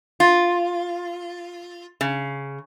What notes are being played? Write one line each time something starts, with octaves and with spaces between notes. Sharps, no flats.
F4
C#3